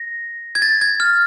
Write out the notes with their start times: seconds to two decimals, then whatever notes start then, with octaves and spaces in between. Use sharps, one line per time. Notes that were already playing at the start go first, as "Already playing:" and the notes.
Already playing: A#6
0.55 G#6
0.62 A6
0.81 G#6
1.00 F6